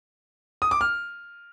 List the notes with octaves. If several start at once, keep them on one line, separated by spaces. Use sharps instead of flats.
D#6
D6
F6